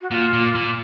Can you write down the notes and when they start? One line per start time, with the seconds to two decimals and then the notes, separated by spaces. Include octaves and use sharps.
0.02 F#4
0.11 A#2 F4
0.33 A#2
0.55 A#2